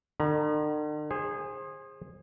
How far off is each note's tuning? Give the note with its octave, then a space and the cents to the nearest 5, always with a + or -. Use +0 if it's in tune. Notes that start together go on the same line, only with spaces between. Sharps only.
D3 +45 A#5 +40
G#4 -20 C5 +25